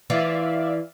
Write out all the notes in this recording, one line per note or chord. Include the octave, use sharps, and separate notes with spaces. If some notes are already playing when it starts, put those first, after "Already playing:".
E3 F4 D5 E5 F5